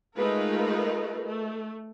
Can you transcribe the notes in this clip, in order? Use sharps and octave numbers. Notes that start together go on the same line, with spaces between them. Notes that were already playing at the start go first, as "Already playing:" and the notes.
G#3 A3 D#4 F4 A#4 B4
A3